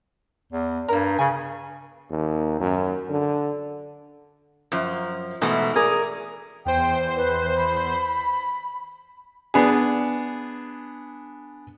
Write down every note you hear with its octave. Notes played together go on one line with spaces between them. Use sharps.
E2
G2 A#3 A#4
C#3 G#5
D#2
F#2
D3
F#2 F3
G#2 B2 E3 A3
G#4 A#4 D5
E2 C5 G5
B4
B5
B3 D4 G#4